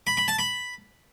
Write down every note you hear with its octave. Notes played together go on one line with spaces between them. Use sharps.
B5
B5
A5
B5